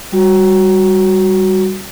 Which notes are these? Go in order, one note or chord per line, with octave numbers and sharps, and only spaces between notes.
G3 F#4